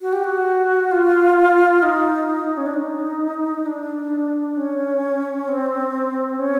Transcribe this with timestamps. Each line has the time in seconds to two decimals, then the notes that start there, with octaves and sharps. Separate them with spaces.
0.02 F#4
0.13 G4
0.24 F#4
0.92 F4
1.83 D#4
2.57 C#4
2.66 D4
2.74 D#4
3.66 D4
4.57 C#4
5.48 C4
6.39 C#4